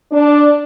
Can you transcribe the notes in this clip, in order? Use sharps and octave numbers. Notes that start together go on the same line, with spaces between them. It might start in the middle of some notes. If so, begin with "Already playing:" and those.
D4